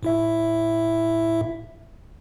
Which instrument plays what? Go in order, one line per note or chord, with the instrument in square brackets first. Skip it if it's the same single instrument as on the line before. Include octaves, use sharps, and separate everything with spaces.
[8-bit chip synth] A2 E4 E5